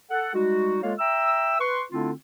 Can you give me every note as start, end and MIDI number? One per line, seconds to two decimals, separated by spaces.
0.10 0.34 69
0.10 0.34 78
0.34 0.77 55
0.34 0.77 56
0.34 0.77 63
0.34 0.77 66
0.82 0.93 56
0.82 0.93 58
0.82 0.93 65
0.82 0.93 69
0.82 0.93 73
0.82 0.93 77
0.99 1.55 76
0.99 1.55 79
0.99 1.55 82
0.99 1.55 88
1.60 1.82 71
1.60 1.82 84
1.60 1.82 85
1.91 2.11 50
1.91 2.11 57
1.91 2.11 60
1.91 2.11 62
1.91 2.11 64
1.91 2.11 65